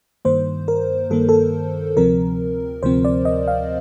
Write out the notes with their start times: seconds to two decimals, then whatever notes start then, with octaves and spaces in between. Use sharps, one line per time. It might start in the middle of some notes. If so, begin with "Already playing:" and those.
0.25 G2 D#3 A#3 C5
0.68 A#4
1.10 G2 D#3 A#3 A4
1.29 A4
1.97 D2 C3 F3 C4 A#4
2.83 D2 C3 F3 C4 C5
3.05 D5
3.25 D#5
3.48 F5